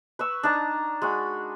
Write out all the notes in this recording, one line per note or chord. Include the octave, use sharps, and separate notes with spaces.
B4 C#6 E6
D4 D#4 A5 A#5
G#3 F#4 B5